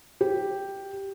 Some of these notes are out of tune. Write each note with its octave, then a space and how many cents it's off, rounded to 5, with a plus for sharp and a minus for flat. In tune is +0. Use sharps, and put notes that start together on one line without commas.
G4 +0